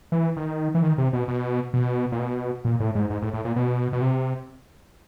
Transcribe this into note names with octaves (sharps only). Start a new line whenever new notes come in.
E3
D#3
E3
D#3
C3
B2
B2
B2
A#2
B2
A#2
A2
G#2
G#2
A2
A2
A#2
B2
B2
C3